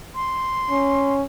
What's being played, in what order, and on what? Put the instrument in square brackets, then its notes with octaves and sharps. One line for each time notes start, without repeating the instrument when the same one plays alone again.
[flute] C6
[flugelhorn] C#4